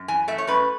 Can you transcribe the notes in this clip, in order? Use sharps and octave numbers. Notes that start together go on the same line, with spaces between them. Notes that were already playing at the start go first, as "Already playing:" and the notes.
Already playing: F#2
E3 G#5
A3 E5
C#5
F#2 B4